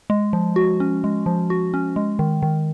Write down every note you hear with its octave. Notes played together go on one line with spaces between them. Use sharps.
G#3
F3
F#4
C#4
G#3
F3
F#4
C#4
G#3
D#3
D#3